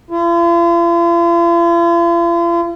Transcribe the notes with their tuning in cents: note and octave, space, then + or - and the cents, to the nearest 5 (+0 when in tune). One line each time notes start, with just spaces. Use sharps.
F4 -45